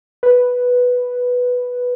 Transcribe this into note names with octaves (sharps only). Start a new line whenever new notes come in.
B4